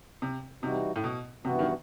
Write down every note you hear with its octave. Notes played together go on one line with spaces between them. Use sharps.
C3
C3 E3 G3 D#4 F#4
A2
B2
G2 C3 E3 B3 F#4
D#3